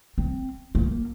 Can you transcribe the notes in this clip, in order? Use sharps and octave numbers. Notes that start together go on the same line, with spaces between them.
C4
A#3